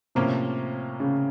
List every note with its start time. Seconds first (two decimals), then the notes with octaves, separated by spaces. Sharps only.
0.15 A2 C3 F3 A#3 C#4
1.00 C#3